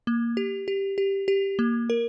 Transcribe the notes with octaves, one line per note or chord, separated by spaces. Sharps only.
A#3
G4
G4
G4
G4
A#3
A#4